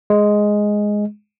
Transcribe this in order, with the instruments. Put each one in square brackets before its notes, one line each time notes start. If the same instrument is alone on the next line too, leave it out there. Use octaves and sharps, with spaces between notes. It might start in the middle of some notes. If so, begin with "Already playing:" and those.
[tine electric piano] G#3